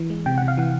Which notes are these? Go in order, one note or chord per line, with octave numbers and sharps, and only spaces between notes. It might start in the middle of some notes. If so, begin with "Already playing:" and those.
Already playing: E3
G#3
C3 G5
C3 F#5
F5
E3 F#5